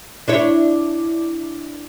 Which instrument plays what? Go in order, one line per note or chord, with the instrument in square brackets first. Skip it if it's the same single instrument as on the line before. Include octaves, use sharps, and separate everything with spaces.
[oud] D4 E4 C#5